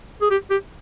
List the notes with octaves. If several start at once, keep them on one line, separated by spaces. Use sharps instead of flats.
G#4
G4
G4